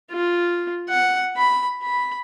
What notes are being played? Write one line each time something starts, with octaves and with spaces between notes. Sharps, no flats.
F4
F#5
B5
B5